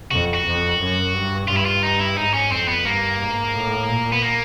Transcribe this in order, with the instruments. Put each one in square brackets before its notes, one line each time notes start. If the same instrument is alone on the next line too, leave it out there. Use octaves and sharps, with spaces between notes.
[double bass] F2 [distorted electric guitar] F#4
[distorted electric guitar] F#4
[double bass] F2
F#2
G2
[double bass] G2 [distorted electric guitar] F4
[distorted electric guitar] E4
F4
D#4
E4
[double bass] G#2 [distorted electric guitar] D#4
[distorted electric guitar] C#4
[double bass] F2 [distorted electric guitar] C4
[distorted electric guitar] B3
[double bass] G2 [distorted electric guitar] A#3
[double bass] G#2
A2
A#2
[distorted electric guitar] B3
A#3